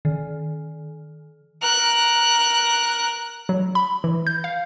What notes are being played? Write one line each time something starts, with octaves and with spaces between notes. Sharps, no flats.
D#3
A#4 F#6
F#3
B5
E3
G6
F5